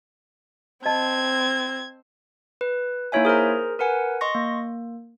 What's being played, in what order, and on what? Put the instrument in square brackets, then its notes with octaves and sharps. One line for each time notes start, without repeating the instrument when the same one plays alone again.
[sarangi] C4 [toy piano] D#5 A5 B5 [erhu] G#6
[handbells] B4
A#3 D#4 E4 C#5 E5 G#5
G#4 A#4 C5 A#5
A#4 B4 F#5 G#5
D#5 C6 C#6 A#6
A#3